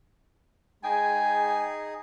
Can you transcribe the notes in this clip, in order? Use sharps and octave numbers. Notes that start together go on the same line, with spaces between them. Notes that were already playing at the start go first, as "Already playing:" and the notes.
G#3 D#4 G#4 G5 G#5